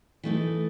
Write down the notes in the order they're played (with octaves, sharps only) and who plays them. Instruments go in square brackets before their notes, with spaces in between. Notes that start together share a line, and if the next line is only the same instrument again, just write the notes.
[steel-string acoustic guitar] E3 A3 D#4 A4